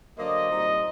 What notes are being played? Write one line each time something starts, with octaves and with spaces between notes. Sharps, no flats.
D3 F#3 A#3 D4 C5 D#5
A#2 G3 C4 D#4